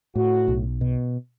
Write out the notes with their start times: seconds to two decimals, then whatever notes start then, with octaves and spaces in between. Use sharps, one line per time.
0.15 A2 F#4
0.48 B1
0.81 B2